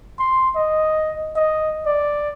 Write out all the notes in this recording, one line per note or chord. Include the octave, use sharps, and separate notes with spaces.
C6
D#5
D#5
D5